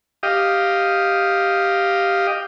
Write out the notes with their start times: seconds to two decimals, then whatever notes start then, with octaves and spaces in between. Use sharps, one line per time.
0.23 G4 D#5 F5